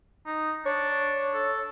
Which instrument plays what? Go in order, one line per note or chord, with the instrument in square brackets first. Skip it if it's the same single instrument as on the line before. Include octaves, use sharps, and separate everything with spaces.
[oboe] D#4
[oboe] D4 [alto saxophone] C#5
[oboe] A4